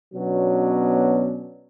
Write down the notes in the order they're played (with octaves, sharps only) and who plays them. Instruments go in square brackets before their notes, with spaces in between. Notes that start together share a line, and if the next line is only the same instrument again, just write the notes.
[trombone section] B2 F#3 B3 C#4 D4